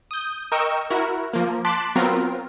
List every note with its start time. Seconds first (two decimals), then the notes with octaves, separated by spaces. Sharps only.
0.11 D#6 G6
0.52 A#4 D#5 G5 C#6 E6
0.90 E4 F#4 A#4
1.33 F3 A#3
1.65 A5 C6 D6 F#6 B6
1.96 F#3 B3 C4 F4 A#4